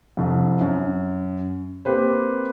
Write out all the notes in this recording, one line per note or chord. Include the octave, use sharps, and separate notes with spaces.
C2 F2
F#2
A#3 C4 G4 B4 C5